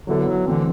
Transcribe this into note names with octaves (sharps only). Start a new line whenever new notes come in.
D3 F#3 B3 E4 A4
F#3
D3 E3 A3 C4